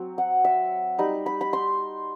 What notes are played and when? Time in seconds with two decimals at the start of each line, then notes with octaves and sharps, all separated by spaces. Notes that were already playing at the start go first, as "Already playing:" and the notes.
Already playing: F#3 C4
0.18 F#5
0.45 E5
0.98 G3 D#4 B5
1.26 B5
1.41 B5
1.53 C6